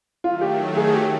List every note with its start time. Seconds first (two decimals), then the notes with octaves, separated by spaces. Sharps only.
0.24 D#3 F#3 A3 F4
0.41 G4
0.77 G#4
0.94 G4